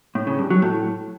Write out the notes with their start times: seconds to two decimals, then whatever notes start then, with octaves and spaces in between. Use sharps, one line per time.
0.15 A2
0.27 C#3
0.39 G2
0.50 F#3
0.62 A2